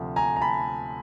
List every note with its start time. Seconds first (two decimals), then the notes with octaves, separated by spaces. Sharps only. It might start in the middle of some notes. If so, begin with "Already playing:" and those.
Already playing: D2 C3 F3
0.16 G#5 A#5
0.36 A#5
0.41 A5 B5